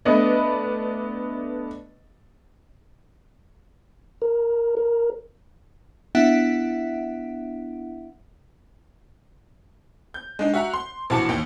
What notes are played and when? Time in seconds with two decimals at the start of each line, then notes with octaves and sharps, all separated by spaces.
0.05 A3 B3 D4 B4 D5 D#5
4.22 A#4
4.77 A#4
6.15 B3 D4 E4 E5 F#5 D7
10.14 G6
10.39 G#3 D4 D#4
10.54 F#4 E5 F#5 A#5
10.74 C6
11.10 A#1 E3 F#4 A5 D6 C#7
11.29 D#2 G5